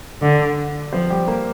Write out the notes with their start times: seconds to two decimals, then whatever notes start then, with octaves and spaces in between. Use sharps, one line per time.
0.22 D3 D4 D5
0.93 F3 C4 C5
1.10 G3 G4
1.28 A#3 A#4